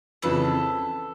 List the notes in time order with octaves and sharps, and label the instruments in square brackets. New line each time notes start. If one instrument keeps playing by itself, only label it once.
[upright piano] F2 C#3 E3 [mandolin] A4 B4